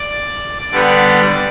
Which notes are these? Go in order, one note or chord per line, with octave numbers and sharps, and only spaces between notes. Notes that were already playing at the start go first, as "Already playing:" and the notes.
Already playing: D5
D3 G3 B3 D5